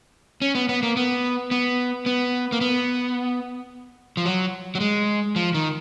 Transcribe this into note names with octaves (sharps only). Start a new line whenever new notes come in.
C#4
B3
B3
A#3
B3
B3
B3
A#3
B3
F3
F#3
F#3
G#3
F3
D#3